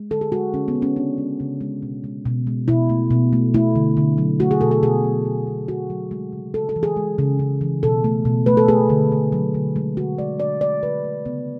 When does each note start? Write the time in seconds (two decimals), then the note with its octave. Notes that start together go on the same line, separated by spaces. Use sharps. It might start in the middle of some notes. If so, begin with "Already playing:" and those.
Already playing: G#3
0.11 D3 A4
0.21 G#4
0.32 G#3 F#4
0.53 D3 C#4
0.68 B3
0.75 G#3
0.82 C#4
0.96 C#3 D4
1.18 G#3
1.40 C#3
1.61 G#3
1.82 B2
2.04 G#3
2.26 B2
2.47 G#3
2.68 B2 E4
2.89 A3
3.11 B2
3.33 A3
3.54 A3 E4
3.76 D3
3.97 D3
4.18 F#3
4.40 A3 F#4
4.51 G#4
4.61 B2 A4
4.71 A4
4.83 B2 G#4
5.04 F#3
5.25 A3
5.47 B2
5.68 B2 F#4
5.90 F#3
6.11 G#3
6.33 C#3
6.54 C#3 A4
6.69 A4
6.76 E3
6.83 G#4
6.96 G#3
7.18 C#3
7.39 C#3
7.61 E3
7.83 B2 A4
8.04 A3
8.25 B2
8.46 A3 B4
8.57 A4
8.68 A3 G#4
8.90 D3
9.12 D3
9.32 F#3
9.54 D3
9.76 G#3
9.97 D3 F#4
10.18 G#3 D5
10.40 D3 D5
10.61 A3 D5
10.83 D3 B4
11.05 A3
11.25 C#3 B3